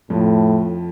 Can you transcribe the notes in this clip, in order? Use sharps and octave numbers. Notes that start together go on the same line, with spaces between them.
F2 A2 F3